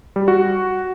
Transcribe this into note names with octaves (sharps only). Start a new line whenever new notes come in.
G3
F#4